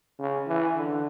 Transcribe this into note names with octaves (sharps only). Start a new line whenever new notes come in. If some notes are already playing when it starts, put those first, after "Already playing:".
C#3
E3
D3